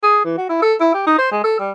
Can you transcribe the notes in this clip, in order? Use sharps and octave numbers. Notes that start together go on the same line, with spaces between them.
G#4
E3
F#4
E4
A4
E4
G4
D#4
C5
G#3
A4
G3